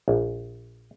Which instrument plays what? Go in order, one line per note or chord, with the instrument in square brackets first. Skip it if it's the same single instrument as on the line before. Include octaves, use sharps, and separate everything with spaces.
[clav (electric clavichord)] A#1